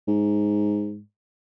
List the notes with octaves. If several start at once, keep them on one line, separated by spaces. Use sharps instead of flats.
G#2